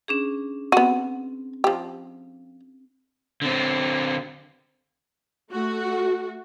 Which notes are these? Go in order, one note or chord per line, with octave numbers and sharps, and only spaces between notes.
C#4 D4 G#4
B3 C4 F#4
F3 G4
D3 C4
A3 F#4